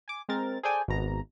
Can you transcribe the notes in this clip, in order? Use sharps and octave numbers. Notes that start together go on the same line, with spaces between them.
G#5 D6
G#3 C4 A#4 A6
G#4 A4 C5 D5 G5 G#5
G#1 B2 A#5